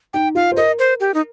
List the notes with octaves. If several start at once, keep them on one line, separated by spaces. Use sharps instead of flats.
D#4 G5
F4 F5
C5
A#4 D#5
C5
G4
D#4